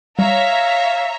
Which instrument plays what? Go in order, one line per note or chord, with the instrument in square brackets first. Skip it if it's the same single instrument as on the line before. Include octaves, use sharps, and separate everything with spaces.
[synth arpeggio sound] G3 [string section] C#5 E5 A#5 [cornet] F5